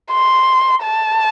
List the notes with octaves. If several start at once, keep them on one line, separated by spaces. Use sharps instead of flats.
C6
A5